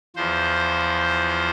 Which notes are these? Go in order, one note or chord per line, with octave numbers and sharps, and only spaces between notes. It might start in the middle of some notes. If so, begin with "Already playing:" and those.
E2 F3 C5